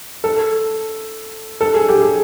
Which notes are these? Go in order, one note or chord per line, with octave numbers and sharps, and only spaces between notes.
A4
A4
G#4
G4
G#4